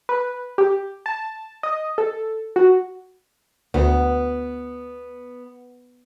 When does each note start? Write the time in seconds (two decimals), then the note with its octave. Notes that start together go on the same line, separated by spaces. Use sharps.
0.09 B4
0.58 G4
1.06 A5
1.63 D#5
1.98 A4
2.56 F#4
3.74 D2 B3